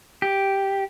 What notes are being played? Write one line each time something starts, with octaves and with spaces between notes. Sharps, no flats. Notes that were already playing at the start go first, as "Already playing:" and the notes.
G4